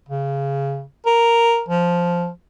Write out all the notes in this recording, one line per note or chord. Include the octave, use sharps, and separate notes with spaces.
C#3
A#4
F3